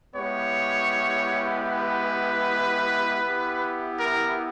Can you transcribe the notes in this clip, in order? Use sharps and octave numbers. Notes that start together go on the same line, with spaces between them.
G#3 B3 E4 G4 C#5
B4
B3 E4 G4
A#4